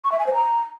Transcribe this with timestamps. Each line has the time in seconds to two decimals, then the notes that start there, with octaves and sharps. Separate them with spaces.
0.04 C#6
0.12 E5
0.19 G#5
0.27 C5
0.34 A#5